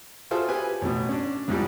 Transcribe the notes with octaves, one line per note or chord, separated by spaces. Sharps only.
F4 F#4 G#4 A4 C5 E5
G4 B4 G#5
A1 B2
C#4 D4
C2 G#2 F3 G3